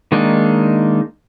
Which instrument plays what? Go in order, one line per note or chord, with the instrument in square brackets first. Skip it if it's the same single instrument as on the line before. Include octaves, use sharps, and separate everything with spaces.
[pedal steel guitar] D#3 G#3 A#3 D4 D#4